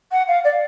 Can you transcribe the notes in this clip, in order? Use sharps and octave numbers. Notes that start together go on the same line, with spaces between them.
F#5
F5
D5